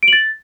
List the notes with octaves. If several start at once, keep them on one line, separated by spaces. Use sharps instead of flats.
D7
F#7
A6